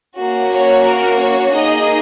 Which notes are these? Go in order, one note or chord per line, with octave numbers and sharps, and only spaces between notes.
A#3 C#4 F#4
C#5
A#4
C#5
A#3 D#4 G#4 D#5